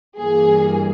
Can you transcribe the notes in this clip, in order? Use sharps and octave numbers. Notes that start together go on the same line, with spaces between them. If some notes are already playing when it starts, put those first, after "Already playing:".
G2 E3 G3 A#3 G#4